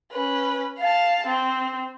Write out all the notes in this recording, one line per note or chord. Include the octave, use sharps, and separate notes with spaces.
C#4 B4
F5 A5
C4